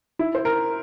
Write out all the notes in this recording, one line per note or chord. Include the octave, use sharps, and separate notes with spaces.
E4
C5
A#4